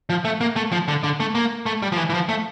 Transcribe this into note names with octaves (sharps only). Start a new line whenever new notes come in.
F3
A3
A#3
A3
F3
D3
D3
A3
A#3
A3
G3
F3
E3
E3
F3
A3